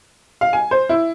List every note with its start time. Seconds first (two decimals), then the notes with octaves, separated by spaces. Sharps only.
0.41 F5
0.53 G#5
0.71 C5
0.89 E4